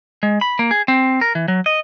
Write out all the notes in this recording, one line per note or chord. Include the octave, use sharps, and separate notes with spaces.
G#3
B5
A#3
G#4
C4
A#4
E3
F#3
D#5